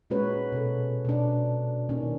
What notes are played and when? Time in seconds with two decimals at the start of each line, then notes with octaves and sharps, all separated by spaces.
0.10 A#2 G#3 C#4 F#4 B4 C#5
0.52 B2 A4
1.05 B2 D4
1.89 A#2 D#3 C#4